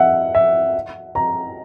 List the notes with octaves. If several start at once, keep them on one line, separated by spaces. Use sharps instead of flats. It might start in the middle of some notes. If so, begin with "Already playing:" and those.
Already playing: E5 F#5
E5
A#5